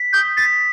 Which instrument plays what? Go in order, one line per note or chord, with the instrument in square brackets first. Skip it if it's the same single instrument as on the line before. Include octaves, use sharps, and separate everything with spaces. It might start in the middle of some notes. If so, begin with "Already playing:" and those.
Already playing: [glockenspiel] B6
[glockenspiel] D#6 [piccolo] G6
[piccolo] A6 [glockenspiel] B6